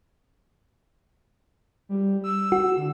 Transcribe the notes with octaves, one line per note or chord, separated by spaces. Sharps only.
G3
E6
F#4
D3